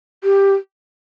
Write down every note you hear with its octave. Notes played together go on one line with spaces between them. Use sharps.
G4